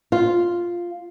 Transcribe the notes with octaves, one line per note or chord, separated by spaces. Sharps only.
F4